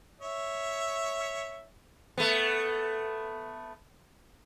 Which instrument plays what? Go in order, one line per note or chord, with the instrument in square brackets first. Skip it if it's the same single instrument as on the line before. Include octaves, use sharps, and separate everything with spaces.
[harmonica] C#5 E5
[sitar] A3 B3